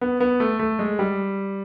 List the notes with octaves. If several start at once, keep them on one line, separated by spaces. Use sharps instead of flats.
B3
B3
A3
A3
G#3
G3